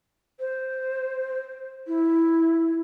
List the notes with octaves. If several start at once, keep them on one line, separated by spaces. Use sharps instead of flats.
C5
E4